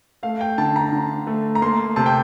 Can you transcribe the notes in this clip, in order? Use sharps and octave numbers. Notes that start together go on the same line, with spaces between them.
A3 F5
G5
D3 A5
A#5
D3
A3
A#5
A#3 C6
C3 A5
G5